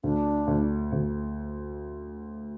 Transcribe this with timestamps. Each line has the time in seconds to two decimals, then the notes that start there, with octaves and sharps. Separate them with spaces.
0.04 D2 D4
0.47 D2
0.92 D2